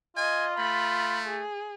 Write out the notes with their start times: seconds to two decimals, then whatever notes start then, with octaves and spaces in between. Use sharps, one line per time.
0.17 F4 D#5 G#5
0.59 A3 B5
1.26 G#4